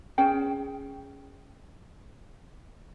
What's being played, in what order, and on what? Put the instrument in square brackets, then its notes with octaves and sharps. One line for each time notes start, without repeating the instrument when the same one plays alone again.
[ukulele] C#4 G#4 G5